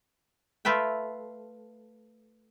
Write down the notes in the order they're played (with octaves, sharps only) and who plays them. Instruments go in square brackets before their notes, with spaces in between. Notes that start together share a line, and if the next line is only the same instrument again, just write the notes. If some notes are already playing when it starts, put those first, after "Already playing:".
[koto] A3 F4 B4 E5 G5